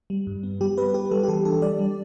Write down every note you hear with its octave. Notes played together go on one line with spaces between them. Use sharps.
G3
G2
B3
G3 G4
B3 B4
B3 G4
G3 A4
G4
E3 A4
D4 A4
G3 D5
G3